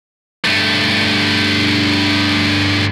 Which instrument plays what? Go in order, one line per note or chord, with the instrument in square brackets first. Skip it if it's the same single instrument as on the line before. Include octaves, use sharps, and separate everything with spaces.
[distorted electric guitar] G2 A3